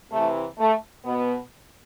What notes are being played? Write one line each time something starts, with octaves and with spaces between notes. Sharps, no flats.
C3 E3 A3
A3
B2 B3